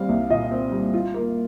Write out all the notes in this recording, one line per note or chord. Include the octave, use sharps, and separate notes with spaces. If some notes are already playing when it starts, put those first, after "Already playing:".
Already playing: G3 C4 F5
C2
A#2 D#5
C4
G3
F4
A#3